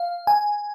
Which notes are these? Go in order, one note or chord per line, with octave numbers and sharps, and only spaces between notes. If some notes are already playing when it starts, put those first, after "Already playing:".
Already playing: F5
G#5